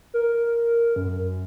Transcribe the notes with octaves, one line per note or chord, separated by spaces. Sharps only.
A#4
F#2